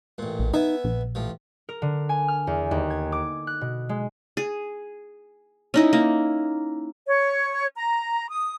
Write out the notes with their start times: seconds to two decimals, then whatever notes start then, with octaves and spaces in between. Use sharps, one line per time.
0.18 A1 A#2
0.39 A#1
0.54 B3 D#4 E5 G#5
0.84 A#1
1.15 A1 F3
1.69 A#4
1.82 D3
2.09 G#5
2.28 F6
2.47 E2
2.71 D#2
2.90 G#6
3.12 D6
3.47 F#6
3.61 B2
3.89 G#3
4.37 G#4
5.74 C#4 D#4 E4
5.93 A#3
7.07 C#5
7.75 A#5
8.30 D#6